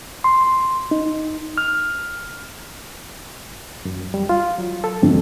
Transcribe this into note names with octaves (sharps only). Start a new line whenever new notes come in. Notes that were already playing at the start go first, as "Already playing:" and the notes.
C6
D#4
F6
F#2
G3
F4
F#3
A4
E1 F2